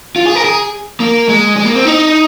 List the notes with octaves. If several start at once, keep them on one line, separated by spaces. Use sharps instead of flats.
F4
G#4
A#4
G#4
A#3
G#3
G#3
A#3
C4
D#4